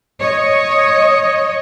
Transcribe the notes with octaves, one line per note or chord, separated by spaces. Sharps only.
C#5 D#5